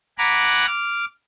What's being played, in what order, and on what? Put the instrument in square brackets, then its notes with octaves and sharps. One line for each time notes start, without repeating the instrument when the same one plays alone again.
[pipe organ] F#5 G#5 A#5 B5 D6 F#6
D6 F6